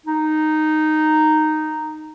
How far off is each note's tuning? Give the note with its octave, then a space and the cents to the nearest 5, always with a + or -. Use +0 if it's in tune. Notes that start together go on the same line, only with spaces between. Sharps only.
D#4 -5